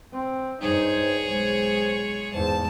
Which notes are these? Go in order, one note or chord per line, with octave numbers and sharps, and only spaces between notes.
C4
G2 D#4 G#4 C5 C#5
B1 G#3 C5
E2 G#2 C5 A5